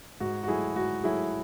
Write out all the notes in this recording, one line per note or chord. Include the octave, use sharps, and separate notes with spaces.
G#2 F#4
F#4
F#3 A3 E4 G#4
G#2 F#4
F#3 A3 E4 G#4